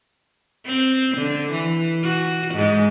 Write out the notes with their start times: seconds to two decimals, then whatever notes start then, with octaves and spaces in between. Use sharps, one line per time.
0.66 C4
1.18 D3
1.52 E3
2.03 F#4
2.55 G#2 G#3